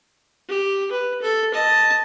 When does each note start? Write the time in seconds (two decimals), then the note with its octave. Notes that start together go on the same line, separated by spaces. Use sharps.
0.48 G4
0.91 B4
1.22 A4
1.54 D#5 A5